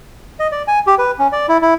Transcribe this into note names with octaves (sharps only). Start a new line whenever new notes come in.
D#5
D5
G#5
G4
B4
C#4
D5
E4
E4